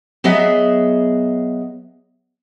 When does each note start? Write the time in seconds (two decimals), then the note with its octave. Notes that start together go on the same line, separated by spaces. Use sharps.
0.24 F#3 B3 G#4 D#5 E5